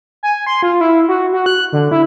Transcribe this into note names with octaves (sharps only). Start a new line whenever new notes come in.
G#5
C6
F4
E4
F#4
F#4
F#6
D3
E4